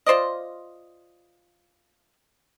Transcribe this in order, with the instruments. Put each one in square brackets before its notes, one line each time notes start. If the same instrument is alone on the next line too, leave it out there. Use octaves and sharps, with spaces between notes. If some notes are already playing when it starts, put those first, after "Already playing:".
[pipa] F4 C5 D5 D#5